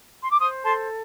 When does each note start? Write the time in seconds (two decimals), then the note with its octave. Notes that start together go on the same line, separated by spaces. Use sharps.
0.23 C6
0.31 D6
0.40 C5 C6 D#6
0.65 A4 A5 C6